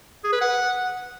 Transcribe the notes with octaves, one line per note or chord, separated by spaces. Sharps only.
G#4
B4
F#5